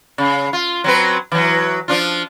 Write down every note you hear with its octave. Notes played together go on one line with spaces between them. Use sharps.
C#3
F4
F#3 C4 B4
E3 F#3
F3 D4 F4